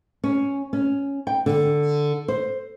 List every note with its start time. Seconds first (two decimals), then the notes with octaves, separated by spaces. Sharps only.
0.24 C#4
0.73 C#4
1.27 G5
1.46 D3
2.28 C5